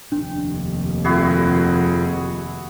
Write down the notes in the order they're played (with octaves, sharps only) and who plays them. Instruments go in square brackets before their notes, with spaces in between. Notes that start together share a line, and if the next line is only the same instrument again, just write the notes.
[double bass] F1 D#2 [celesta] D4
[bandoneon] F2 [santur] E4 F#4 G#4